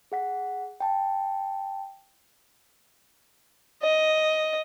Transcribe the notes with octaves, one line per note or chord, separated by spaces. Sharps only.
G#4 F#5 B6
G5 A5
D#5